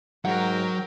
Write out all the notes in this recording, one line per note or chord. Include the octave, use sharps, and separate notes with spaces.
G#2 F#3 A#4 F#5 G5